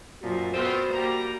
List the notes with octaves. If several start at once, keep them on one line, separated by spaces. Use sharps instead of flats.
F#2 A#2 F3 F#4
A3 B3 C4 F4 C5
G3 A#3 A#5